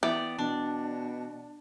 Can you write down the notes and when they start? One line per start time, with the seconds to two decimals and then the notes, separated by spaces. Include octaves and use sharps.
0.03 E3 B3 D5 G5
0.39 B2 D4